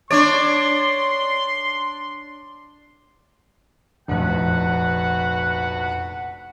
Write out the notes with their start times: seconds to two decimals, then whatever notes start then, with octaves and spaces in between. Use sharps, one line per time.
0.11 D4 C#5 D5 C6
4.08 F1 A#1 F#4 B4 F#5